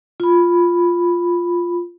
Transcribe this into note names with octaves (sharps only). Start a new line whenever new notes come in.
F4 B5